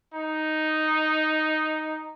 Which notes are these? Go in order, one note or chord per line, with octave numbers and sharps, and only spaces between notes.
D#4